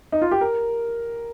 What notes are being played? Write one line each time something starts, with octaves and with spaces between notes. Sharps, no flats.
D#4
F4
G4
A#4